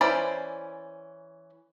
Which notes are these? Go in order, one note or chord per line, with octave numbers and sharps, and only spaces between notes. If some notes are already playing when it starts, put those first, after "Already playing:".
E3 C#4 C5 D5 B5